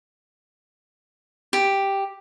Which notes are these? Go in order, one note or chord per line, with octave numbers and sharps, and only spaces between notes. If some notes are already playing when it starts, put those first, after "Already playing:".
G4